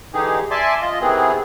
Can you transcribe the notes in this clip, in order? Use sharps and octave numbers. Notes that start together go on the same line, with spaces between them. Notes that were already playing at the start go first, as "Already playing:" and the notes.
D3 E3 D#4 G4 G#4
D5 E5 G#5 A5 C6 D6
F4 D#5
C3 D#3 E3 B3 C4 G#4